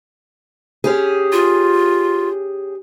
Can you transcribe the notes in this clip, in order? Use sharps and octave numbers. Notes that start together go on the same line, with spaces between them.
C#4 G4 G#4
F4